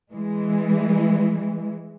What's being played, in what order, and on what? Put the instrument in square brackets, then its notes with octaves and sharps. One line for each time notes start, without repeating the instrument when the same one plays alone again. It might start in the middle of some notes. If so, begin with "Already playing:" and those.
[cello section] E3 G#3